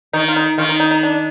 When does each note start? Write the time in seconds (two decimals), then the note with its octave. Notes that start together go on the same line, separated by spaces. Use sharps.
0.13 D#3 D#4
0.28 F4
0.36 D#4
0.58 D#3 F4
0.69 D#4
0.80 D#4
0.91 D#4
1.03 D4